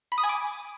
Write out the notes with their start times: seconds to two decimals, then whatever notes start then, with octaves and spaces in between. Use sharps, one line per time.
0.12 B5
0.18 D#6
0.23 G#5
0.29 D6